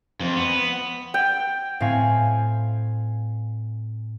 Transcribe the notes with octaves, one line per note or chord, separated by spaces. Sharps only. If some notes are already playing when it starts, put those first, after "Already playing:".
F2
B3
G5
A2 C4 F5 G#5